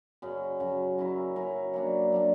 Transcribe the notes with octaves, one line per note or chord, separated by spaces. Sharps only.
F#2 C#3 F#3
F#2 C#3 F#3
F#3 C#4 E4 A#4
F#3 C#4 E4 A#4
F#3 A#3 D4
F#3 A#3 D4